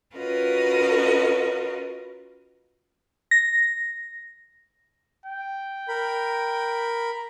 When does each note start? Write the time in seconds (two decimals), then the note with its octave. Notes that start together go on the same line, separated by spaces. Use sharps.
0.15 C#4 F4 F#4 A#4 B4 D#5
3.31 A#6
5.26 G5
5.88 A#4 B5